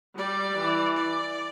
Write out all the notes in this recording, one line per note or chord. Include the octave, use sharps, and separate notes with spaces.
G3 D5
E3
D5